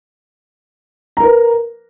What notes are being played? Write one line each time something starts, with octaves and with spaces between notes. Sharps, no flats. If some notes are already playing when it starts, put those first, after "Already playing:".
A#4 B4 A#5